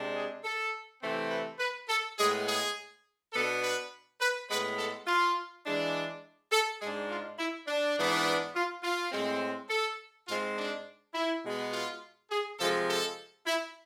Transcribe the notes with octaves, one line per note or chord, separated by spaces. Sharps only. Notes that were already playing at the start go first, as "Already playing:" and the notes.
Already playing: C3 G#3 D4
G#4
A4
C3 E3 A3 C4
B4
B4
A4
A2 G#3 B3 G#4
G#4
B2 B3 D4 A4
B4
B4
A2 G#3 B3 B4
A4
F4
E3 G#3 D4
A4
G#2 G#3 D4 G#4
F4
E4
D4
G#2 E3 B3 D4
F4
F4
A2 G#3 C4
A4
G#2 G#3 C4 F4
D4
E4
B2 G#3 B3
F4
G#4
C3 F3 G#3 A4
A4
E4